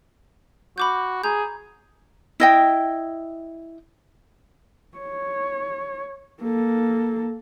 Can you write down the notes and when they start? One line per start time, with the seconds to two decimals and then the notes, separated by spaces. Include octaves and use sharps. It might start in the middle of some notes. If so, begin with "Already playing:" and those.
0.78 F#4 B5 D6 G6
1.24 G#4 A#5 G6
2.40 E4 D#5 G5
4.98 C#5
6.43 A#3 A4